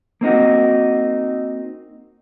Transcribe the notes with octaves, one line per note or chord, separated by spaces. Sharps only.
A#3 C4 D#4 F#4